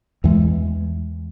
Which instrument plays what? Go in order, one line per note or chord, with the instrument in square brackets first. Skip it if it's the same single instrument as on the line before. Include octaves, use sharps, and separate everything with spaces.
[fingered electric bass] E2 E3 G#3